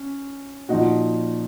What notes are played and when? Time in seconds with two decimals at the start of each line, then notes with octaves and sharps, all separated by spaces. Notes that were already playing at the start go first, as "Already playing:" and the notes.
Already playing: C#4
0.69 A#2 F3 D#4 F#4